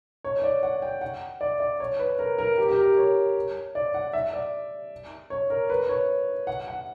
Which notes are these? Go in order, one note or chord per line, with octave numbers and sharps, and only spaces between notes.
C#5
C#5
D5
F#5
G5
F#5
D5
D5
C#5
B4
A#4
A#4
G4
G4
A#4
C#5
D5
F#5
E5
D5
C#5
A#4
B4
C#5
F#5
F#5